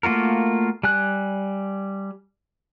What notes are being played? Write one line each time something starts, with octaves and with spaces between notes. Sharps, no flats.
A3 A#3 F4 F#4 A#4
G3 G#5 F#6